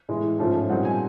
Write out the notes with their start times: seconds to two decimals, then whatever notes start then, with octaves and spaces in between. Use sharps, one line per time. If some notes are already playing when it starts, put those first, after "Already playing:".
0.09 A2 E3 G#3
0.39 G#2 F3 A3 C#4 F4
0.70 A#2 G3 C4 D#4 F#5
0.85 G#5